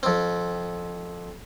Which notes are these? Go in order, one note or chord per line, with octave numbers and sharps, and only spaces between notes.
F2 C4